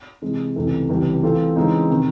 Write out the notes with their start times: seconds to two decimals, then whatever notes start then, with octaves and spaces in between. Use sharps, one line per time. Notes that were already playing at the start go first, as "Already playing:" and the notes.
0.22 C3 E3 G#3
0.56 C#2 C3 E3 A3
0.89 C#2 C3 E3 G3
1.22 E3 A3 C4 F4 A4
1.56 C#3 E3 G#3 C4 D#4
1.90 C3 D#3